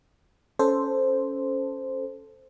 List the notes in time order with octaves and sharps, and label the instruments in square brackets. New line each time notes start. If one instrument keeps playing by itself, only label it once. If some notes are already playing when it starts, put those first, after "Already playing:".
[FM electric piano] C#4 A4 C5